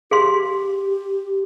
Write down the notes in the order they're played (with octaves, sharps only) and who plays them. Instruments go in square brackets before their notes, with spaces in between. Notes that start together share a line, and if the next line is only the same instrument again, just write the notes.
[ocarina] G4 [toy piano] G#4 F5 C6
[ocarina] G4